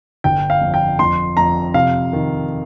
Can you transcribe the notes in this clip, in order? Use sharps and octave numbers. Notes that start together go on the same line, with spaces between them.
G1 G5
F5
F2
G5
F2 C6
F2 A#5
C3 F5
D#3